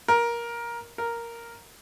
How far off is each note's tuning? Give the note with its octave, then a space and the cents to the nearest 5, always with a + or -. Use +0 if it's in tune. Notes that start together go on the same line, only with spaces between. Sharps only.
A#4 +15
A#4 +0